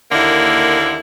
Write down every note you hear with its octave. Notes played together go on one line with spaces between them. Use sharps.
D#2 D3 A#3 E4